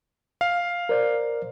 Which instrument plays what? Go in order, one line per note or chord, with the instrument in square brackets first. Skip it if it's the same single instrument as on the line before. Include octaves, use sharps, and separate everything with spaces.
[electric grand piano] F5
[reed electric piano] A#4 C5 D5